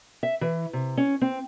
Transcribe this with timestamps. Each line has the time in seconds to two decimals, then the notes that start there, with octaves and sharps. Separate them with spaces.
0.23 E5
0.41 E3
0.73 C3
0.97 C#4
1.21 C4